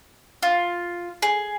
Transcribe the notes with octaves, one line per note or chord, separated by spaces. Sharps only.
F4
G#4